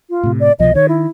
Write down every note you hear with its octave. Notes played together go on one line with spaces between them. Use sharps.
F4
A2 C3
D5
C2 B2 F3 D#5
D#3 C#5
E4